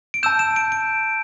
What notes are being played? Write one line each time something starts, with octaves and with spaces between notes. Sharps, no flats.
D7
A5 E6 G6 E7
E7
D7
D7